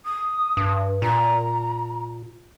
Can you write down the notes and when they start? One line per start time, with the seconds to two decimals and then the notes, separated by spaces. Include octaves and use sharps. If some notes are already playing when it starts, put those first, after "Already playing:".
0.04 D#6
0.57 G2
1.02 A#2 A#5